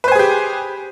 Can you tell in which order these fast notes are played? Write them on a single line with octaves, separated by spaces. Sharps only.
B4 C5 G#5 G#4 G4